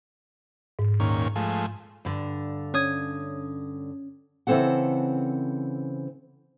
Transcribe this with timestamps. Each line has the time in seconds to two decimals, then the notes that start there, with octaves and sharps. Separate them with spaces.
0.79 G#2
1.00 D#2 A#2 C#4
1.36 F3 G#3 A3
2.05 G2 D3
2.74 C#4 D#6 G#6
4.47 C#3 E3 F#3 C4 A4 F#5